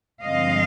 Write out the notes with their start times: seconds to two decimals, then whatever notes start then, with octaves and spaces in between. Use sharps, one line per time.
0.22 G2 D3 F3 G#3 C4 D#5 F5